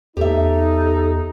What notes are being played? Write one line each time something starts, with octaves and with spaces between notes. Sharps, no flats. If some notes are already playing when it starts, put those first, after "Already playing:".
E2 D#4 G4 A4 E5